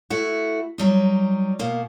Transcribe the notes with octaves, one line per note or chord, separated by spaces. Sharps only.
A3 E4 F#4
F#3 G3 D#4
B2 A#3